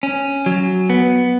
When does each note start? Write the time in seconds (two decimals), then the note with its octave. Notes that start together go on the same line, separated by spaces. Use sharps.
0.03 C#4
0.46 F#3
0.90 B3